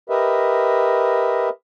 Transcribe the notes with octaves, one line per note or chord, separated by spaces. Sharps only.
G4 A#4 B4 D#5 E5